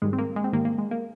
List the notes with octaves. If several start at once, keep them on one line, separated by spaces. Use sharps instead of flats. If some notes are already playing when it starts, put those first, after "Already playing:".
G#2 D#3 G3 G#3
C4
A#3
G#3
C4
G#2 D#3 G3 A#3
A#3
G#3
A#3